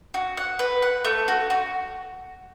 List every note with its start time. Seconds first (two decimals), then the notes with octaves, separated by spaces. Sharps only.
0.14 F#4
0.37 F#5
0.59 B4
0.82 F#5
1.05 A3
1.28 F#4
1.50 F#4